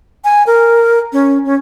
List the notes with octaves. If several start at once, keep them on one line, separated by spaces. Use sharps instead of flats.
G#5
A#4
C#4
C#4